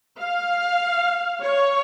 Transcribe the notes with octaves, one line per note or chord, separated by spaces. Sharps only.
F5
C#5